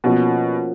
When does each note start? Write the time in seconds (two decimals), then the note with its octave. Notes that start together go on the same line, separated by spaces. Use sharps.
0.04 B2 F3 A#3 C#4 F#4